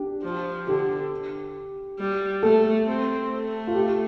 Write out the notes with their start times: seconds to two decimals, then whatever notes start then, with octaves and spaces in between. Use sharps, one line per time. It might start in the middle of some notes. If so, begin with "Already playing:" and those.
Already playing: D4 G4
0.23 F3
0.67 D3 G4
1.99 G3
2.43 A3 A4
2.86 C4
3.30 A3
3.67 F4
3.75 G4